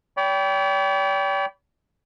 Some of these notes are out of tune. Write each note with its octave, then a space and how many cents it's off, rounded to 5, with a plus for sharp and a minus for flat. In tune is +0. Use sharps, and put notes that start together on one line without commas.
D5 -45 G5 -5 B5 +0